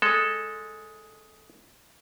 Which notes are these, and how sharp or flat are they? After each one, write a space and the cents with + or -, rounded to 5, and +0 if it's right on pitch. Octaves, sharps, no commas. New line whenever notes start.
G#3 +5 A4 +0